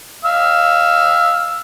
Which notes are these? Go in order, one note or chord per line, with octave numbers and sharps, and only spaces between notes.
F5 E6